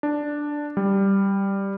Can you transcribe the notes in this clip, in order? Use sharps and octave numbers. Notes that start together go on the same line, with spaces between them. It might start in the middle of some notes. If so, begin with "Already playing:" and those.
D4
G3